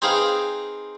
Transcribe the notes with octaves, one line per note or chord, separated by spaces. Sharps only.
C4 D#4 G#4 B4 F5 G5